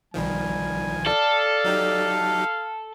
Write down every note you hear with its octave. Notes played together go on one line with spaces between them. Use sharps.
B1 D#3 F3 G3 G#5
A4 D5 F5
F#3 D#4 G4